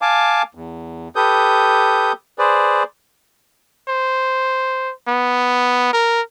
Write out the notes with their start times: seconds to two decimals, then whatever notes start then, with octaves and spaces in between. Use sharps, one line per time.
0.02 F5 G#5 A5 D6
0.55 E2
1.16 G4 A4 B4 D#6 G6
2.39 G#4 B4 C5 D5
3.89 C5
5.08 B3
5.93 A#4